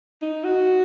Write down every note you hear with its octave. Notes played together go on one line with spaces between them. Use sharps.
D#4
F#4